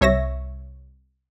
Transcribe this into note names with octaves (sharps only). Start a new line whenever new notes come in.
C2 C#5 E5 A#6